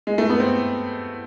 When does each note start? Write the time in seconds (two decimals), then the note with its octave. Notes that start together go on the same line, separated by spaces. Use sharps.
0.07 G#3
0.18 A3
0.29 B3
0.40 C4